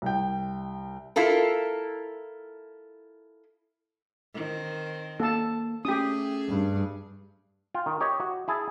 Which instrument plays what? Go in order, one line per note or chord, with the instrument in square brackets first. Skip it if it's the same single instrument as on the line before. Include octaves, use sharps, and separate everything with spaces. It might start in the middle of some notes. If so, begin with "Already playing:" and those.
[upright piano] C2 G5
[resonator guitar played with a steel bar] E4 F4 A4 A#4
[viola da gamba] D#3 C4
[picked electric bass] A#3 [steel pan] A4 A5
[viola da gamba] A3 G#4 [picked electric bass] C#4 [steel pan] G4 D#6
[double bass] G2
[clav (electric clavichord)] F4 G5
D#3
G4 C#5 D#5
F#4
E4 G#4 A5